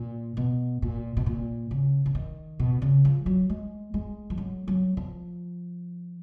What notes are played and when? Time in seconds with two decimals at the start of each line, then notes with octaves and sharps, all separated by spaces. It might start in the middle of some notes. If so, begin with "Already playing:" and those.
Already playing: A#2
0.37 B2
0.82 A#2
1.17 B2
1.26 A#2
1.71 C#3
2.06 C#3
2.15 D#3
2.60 B2
2.82 C#3
3.05 F3
3.26 F#3
3.49 G#3
3.94 G#3
4.30 F3
4.38 F#3
4.68 F#3
4.97 F3